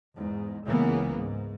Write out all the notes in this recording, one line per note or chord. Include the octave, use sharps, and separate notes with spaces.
E2 G#2
C#2 C#3 E3 G#3 A#3 B3
G#2